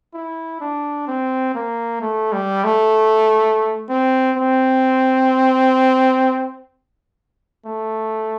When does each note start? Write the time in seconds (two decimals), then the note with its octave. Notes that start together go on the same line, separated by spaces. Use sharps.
0.14 E4
0.60 D4
1.07 C4
1.55 A#3
2.01 A3
2.33 G3
2.64 A3
3.89 C4
4.37 C4
7.66 A3